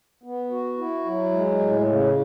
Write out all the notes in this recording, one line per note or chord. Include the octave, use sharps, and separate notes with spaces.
B3
F#4
E4
F#3
G#3
A2
C#3